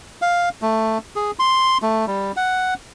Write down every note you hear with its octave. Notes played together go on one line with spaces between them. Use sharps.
F5
A3
G#4
C6
A3
G3
F#5